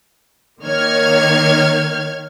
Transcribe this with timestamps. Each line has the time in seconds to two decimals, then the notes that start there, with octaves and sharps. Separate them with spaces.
0.63 D#3 A#3 C#5 F6 G#6